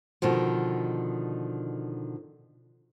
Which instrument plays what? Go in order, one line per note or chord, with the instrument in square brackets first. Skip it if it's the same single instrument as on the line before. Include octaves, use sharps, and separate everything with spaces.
[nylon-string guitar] B2 D3 D#3 F3